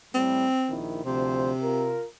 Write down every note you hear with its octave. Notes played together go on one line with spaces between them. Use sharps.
A2 G3 A3 C4
A#1 D#3 E4
D2 C3 F3 C5
F4 A#4